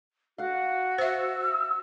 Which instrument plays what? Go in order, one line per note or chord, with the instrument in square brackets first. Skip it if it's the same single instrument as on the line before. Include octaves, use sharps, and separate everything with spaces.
[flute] F#4 [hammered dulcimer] F5 F#5
[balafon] C5 E5 [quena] E6